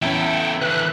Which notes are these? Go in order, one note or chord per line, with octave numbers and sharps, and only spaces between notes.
E2 B3 C#4 E4 A4 G5
D3 E3 B4 F#6